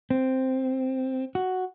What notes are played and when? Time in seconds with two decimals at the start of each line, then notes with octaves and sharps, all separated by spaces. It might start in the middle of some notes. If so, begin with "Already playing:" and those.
0.10 C4
1.35 F#4